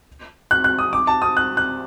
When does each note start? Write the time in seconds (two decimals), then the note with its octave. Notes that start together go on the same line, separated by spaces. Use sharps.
0.51 F#6
0.64 F#6
0.79 D#6
0.93 D6
1.07 A5
1.22 D#6
1.37 F#6
1.57 F#6